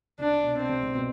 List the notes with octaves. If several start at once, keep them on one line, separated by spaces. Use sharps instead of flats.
C2 C3 D4
B2
C4
C2 C3
G#2
B2